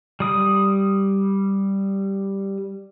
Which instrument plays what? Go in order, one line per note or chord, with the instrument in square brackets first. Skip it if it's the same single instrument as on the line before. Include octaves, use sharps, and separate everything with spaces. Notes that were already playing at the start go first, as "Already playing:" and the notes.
[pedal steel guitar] G3 D#6